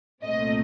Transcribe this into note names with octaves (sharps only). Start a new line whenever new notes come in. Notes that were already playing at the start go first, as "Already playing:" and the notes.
C2 A#2 A3 C4 D#5